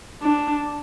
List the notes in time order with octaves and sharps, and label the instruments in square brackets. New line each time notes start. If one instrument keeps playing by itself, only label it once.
[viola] D4